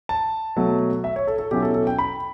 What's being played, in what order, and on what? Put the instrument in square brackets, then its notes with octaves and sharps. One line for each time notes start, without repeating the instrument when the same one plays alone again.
[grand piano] A5
B2 F#3 A3
E5
C#5
A4
A4
B2 F#3 C#4 E4 G4
A4
A4
G5
B5